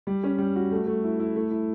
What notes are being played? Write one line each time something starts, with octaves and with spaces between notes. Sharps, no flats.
G3
C#4
G3
F#4
A3
A3
E4
E4
A3
E4